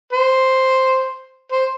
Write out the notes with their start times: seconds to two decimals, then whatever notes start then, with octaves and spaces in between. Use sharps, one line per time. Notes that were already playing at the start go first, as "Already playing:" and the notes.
0.13 C5
1.52 C5